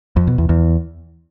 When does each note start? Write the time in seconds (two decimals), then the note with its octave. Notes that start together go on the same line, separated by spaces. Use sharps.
0.16 F2
0.27 B2
0.38 E2
0.49 E2